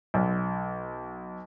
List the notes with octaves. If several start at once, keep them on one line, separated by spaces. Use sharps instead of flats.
B1